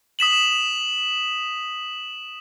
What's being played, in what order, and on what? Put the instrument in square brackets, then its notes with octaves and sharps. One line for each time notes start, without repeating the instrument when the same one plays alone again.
[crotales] D#6 B6 E7 F#7